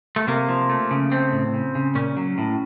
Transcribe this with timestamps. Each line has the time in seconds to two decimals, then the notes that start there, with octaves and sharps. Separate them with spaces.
0.16 A3
0.27 C3 A#3
0.48 F3
0.69 A3
0.91 C#3
1.12 A3 C4
1.33 A2
1.54 C#3
1.75 C#3
1.95 A#2 C#4
2.17 F#3
2.38 A2